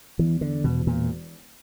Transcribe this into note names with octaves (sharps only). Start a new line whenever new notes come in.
E2 E3
D3
E1 B2
A#2